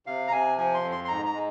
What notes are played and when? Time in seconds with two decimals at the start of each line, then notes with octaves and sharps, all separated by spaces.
0.06 C3 F5
0.28 A#5
0.32 C3 G#5
0.58 F3 G#5
0.74 C6
0.83 F2
0.91 C6
1.05 C6
1.08 G#2 A#5
1.25 A#5
1.34 G#3